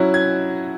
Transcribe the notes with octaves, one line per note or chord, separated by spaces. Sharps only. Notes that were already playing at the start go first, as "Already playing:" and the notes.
Already playing: F#3 C#4 E4 F#6
G#6